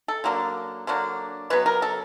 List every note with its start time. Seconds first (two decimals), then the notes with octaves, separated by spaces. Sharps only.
0.08 A4
0.24 D3 F#3 A#3 D4
0.87 D3 F#3 A#3 D4
1.50 C#3 F#3 B3 B4
1.66 A#4
1.82 A4